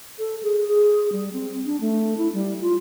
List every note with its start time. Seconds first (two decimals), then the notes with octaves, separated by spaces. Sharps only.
0.19 A4
0.43 G#4
0.68 G#4
1.12 G3
1.33 C4
1.66 D4
1.81 A3
2.18 E4
2.34 G3
2.61 F4